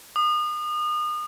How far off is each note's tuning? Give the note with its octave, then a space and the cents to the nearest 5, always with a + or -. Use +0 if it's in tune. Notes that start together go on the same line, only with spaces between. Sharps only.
D#6 -35